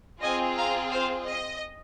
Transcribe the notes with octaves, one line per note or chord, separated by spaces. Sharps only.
C4 F4 G#4 D#5 G#5
F5 A#5
C5 F5
D#5